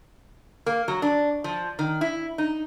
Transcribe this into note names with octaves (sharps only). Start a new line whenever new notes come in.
A#3
F#3
D4
F3
D#3
E4
D#4